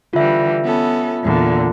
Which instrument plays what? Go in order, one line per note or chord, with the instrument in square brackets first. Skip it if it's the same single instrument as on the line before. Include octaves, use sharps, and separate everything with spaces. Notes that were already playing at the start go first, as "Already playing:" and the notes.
[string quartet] D3 E3 G3 [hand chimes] F4 E5
[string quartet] B3 C#4 A4
E2 A#2 D3